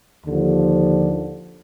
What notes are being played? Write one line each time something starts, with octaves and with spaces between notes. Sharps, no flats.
D#2 D3 F3